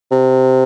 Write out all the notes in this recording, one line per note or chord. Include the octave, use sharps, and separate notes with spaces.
C3